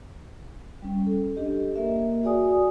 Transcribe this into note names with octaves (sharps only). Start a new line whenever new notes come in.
G3 C#4
A4
D4 G4 D#5
A#3 A#4 E5
F#4 G#4 D5 G#5 D#6